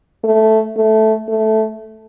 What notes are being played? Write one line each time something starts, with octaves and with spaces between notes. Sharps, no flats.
A3
A3
A3